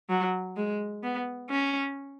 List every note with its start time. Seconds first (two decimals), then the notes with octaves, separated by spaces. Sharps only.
0.10 F#3
0.57 G#3
1.03 B3
1.50 C#4